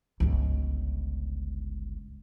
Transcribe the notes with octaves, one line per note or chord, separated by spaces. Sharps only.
G1 C#2